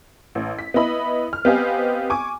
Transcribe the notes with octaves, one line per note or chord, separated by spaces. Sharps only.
A1
B6
B3 E4 D#5 B5
F6
B3 C4 G4 D#5 F5 G#5
G#5 C#6 D6